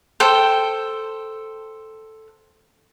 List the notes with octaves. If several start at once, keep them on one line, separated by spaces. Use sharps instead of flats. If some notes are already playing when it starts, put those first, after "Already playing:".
A4 C5 G5